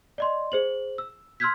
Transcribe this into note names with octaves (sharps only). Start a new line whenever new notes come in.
D5 D#5 C6
G#4 C5 F#7
E6
C6 E6 F6 G6 G#6 B6